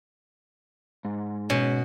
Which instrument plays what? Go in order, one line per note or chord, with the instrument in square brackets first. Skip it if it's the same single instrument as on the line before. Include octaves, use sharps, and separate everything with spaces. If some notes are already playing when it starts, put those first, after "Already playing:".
[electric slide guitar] G#2
[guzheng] B2 [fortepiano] C#4